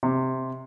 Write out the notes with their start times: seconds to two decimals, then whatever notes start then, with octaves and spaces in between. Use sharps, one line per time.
0.03 C3